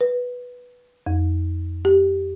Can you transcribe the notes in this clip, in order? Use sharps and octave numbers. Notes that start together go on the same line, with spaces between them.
B4
F2
G4